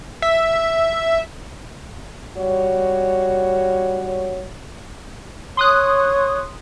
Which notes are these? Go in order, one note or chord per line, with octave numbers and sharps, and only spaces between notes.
E5
G3 F#4 C#5
C#5 C6 D#6 F#6